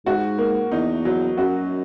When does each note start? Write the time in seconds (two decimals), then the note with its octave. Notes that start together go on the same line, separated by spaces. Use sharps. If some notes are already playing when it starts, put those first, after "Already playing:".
0.06 G#2 F#4
0.38 A#3
0.71 E2 D#4
1.05 F#3
1.37 F#2 F#4